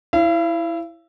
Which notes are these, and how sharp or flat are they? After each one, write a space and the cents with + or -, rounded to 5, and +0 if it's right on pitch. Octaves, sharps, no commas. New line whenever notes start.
E4 +0 C#5 +0 F5 -45